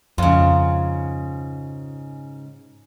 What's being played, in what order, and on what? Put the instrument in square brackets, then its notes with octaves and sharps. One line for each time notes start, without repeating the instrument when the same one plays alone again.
[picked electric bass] F2 [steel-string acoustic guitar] G#2 C#3 [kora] F4